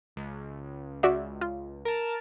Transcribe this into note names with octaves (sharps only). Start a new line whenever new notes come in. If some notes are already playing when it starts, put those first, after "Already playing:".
C#2
C#2 F#4 D5 E5
F4
A#4 A5